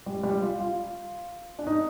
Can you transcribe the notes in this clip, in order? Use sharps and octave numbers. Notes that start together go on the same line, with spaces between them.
G3
G3
F4
F4
D4
D#4